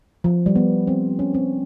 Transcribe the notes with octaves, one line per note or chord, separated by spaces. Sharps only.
F3
G3
B3
C4
C#4
C4